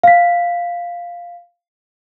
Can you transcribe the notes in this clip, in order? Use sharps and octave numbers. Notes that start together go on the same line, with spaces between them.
F5 B6